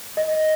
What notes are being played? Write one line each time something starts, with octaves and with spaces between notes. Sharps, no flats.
D#5